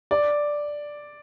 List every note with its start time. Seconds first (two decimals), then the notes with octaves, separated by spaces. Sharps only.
0.11 D5